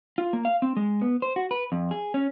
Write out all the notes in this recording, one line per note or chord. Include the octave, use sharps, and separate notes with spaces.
F4
A#3
F5
C4
G#3
B3
C5
F#4
B4
F2
G#4
C#4